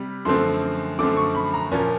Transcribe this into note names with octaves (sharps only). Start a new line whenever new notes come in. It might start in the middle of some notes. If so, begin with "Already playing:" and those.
Already playing: C3 G3
F#2 D3 F3 A3 C4 C6
F#2 D3 F3 A3 C4 D6
C#6
B5
A#5
A#2 F3 A#3 C#4